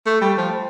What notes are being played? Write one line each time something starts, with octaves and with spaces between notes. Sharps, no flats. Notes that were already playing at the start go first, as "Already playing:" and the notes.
A3
G3
F3